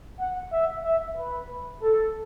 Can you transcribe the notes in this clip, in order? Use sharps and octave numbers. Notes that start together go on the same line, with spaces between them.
F#5
E5
E5
B4
A4